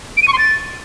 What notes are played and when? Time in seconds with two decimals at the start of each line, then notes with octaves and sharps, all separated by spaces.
0.17 D7
0.22 D#7
0.28 C#6
0.33 C6
0.38 A6